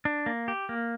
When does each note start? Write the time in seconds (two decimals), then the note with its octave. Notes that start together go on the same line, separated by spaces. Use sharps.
0.05 D4
0.26 A#3
0.48 G4
0.69 A#3